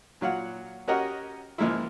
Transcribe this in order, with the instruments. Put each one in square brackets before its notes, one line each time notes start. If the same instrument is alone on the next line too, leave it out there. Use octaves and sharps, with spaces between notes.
[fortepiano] A#2 F#3 F5 F#5
C#4 F#4 G4 A#4 D#5 F#5
C#2 F3 G#3 A#3 E4